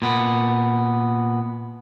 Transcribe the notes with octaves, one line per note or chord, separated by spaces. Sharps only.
A#2 B3